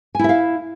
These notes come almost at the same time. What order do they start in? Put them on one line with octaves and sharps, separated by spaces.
G#5 E4 E5 F5